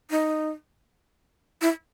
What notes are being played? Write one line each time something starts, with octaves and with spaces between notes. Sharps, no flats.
D#4
E4